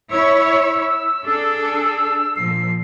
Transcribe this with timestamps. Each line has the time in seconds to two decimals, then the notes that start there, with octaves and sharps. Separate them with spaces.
0.11 E4 C#5 E6
1.22 D4 G#4 A4
2.36 A#2 F3 C7